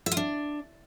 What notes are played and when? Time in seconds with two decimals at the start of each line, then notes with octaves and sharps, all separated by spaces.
0.06 E5
0.12 F4
0.17 D4